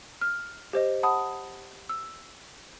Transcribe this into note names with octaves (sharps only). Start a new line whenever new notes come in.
F6
G4 C5 D#5
F#5 A5 B5 D#6
E6